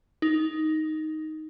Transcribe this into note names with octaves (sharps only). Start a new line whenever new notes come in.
D#4